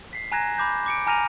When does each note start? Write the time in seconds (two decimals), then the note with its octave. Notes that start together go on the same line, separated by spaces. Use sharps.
0.13 B6 C7
0.32 G#5 A#5 F#6 G#6 A#6 E7
0.57 B5 D6 G6 A#6
0.86 D6 C#7 D7
1.07 G#5 A#5 F6 A#6 D#7 F7